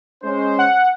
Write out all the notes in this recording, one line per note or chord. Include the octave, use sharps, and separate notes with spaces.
G#3 C#4 C5
F#5